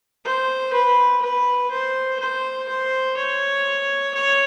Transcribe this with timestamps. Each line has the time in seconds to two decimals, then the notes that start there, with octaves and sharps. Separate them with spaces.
0.25 C5
0.73 B4
1.22 B4
1.70 C5
2.19 C5
2.68 C5
3.17 C#5
4.15 C#5